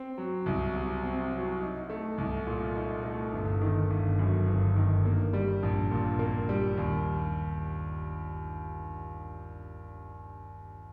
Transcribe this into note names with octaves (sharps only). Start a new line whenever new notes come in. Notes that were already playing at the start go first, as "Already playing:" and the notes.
Already playing: C4
F#3
C2
C3
C4
F#3
D#4
A3
C2
A#2
D#4
A3
G1
D#3
G1
F#2
G1
D#3
A#3
G3
A#1
A#2
A#3
G3
D#2